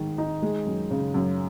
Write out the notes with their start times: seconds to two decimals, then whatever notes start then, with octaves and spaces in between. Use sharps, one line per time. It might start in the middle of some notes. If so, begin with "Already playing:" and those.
Already playing: G#2 D#3 G#3
0.18 D#4
0.42 G#3
0.66 F#2
0.91 C#3
1.14 F#2